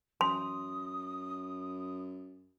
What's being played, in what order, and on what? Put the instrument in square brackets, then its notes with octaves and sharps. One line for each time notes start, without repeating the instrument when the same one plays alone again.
[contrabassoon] F#2 [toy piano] C6 [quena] D#6